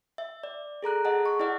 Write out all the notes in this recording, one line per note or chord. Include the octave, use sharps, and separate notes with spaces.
E5
D5
G#4 A4 A#5 F#6
G#4 D#5 F#5 A5
C#6
E4 D5 D#5 F#5